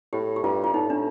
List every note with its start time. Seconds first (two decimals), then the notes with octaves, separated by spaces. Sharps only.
0.13 A2 G4
0.36 G4
0.43 G2 F4
0.64 F4
0.74 A2 D#4
0.90 D4